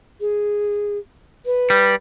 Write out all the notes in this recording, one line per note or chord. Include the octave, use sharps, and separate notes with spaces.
G#4
B4
G3